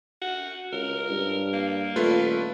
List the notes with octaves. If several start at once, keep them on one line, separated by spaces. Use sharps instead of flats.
F#4
C#2 A#4
G2
A#3
D#1 A3 F4 B4